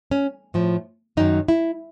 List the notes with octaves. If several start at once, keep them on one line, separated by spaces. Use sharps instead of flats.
C#4
A2 F3
F#2 D#3 F#3 D#4
E4